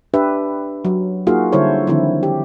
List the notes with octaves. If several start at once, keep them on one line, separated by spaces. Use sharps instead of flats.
D4 G4 B4 E5
F#3
A#3 D#4 F4 F#4 G#4 F5
D3 G3 E4 A4 C5 C#5
D3 D#3 F3 C4 E4
G4